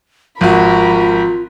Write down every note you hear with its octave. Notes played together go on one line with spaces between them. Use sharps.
G#1 F3 F4 F#4 A#4 B5